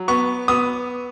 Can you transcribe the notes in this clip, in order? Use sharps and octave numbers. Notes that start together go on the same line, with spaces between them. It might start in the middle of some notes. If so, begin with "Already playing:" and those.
Already playing: F#3
B3 C#6
B3 D#6